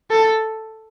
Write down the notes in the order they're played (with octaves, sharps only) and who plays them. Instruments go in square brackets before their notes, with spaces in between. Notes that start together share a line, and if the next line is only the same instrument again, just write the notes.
[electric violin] A4